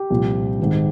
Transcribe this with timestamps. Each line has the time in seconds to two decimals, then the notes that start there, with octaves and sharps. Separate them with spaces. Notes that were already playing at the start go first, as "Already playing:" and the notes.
Already playing: G4
0.10 C2 A#2 F3
0.60 G#1 G#2 D#3